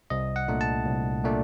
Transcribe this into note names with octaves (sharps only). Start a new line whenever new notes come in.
C2 D#5
F#5
A#2 A3 D4
A5
C2
A#2 A3 D4